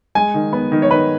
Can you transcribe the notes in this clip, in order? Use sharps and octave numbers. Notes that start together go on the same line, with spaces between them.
G#3 G#5
D#3
B3
D#3
C#5
D#3 B4